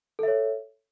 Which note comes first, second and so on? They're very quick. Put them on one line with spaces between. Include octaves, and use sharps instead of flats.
A4 E5 C#5